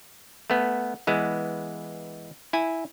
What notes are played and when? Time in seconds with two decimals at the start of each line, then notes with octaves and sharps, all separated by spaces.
0.50 A3 B3
1.07 E3 G#3 B3
2.53 E4 G#5